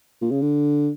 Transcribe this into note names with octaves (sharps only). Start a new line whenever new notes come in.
A#2
C#3
D3